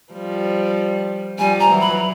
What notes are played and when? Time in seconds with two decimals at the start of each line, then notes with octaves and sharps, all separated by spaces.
0.13 F3 G3
1.38 F3 G3 G#5
1.60 A#5
1.70 E3 F#3
1.81 B5